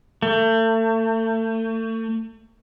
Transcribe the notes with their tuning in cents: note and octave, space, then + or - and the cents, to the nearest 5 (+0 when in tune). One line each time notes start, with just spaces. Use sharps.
A3 +35